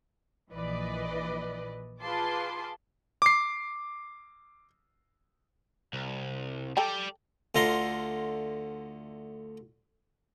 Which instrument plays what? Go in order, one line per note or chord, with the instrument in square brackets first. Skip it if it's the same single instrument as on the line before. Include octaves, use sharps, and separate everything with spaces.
[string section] A#1 E3 B4 D5 D#5
F4 G#4 B4 A5 C6 D6
[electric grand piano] D6 C7
[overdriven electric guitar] C2
[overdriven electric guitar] G3 D5 [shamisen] A4 G5 A#5
[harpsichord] D2 D3 F4 A#5 C6